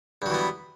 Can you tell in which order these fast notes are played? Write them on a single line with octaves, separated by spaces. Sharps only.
G2 F#3 E3 B3